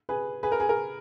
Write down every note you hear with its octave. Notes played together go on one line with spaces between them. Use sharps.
G#4 B4
G#4 B4
A#4
G#4
A#4